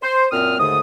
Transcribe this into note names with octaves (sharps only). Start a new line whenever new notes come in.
C5
F#2 A#2 C4 D#6 F6
D#2 G#2 D3 A3 D#6